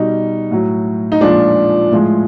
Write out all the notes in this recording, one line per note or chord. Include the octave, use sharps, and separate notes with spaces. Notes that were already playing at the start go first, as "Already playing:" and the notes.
Already playing: B2 G3 D#4
A2 F#3
D#4
A#2 F3 G#3 D4
A2 F3 G#3